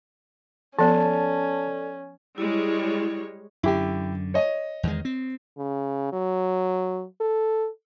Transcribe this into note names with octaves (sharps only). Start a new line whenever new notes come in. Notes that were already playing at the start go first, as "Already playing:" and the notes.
F3 B3 C#4 A4 D5 A5
G3 G#3 E4 C#5
F#2 D3 E4 G4
C#5 D#5
E2 D#3 G#3
C4
C#3
F#3
A4